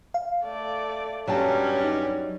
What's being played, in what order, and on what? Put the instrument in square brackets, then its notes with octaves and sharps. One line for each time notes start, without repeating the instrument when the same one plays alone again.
[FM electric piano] F5
[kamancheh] A3 D5
[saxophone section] G2 G3 [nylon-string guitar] F#3 G5 A5 [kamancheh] C#4
[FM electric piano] D#4